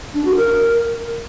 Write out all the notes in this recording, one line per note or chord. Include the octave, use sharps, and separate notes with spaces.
D4
F#4
A#4